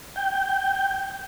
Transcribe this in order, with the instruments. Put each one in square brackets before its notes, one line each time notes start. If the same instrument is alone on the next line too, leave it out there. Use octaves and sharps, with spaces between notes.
[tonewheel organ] G5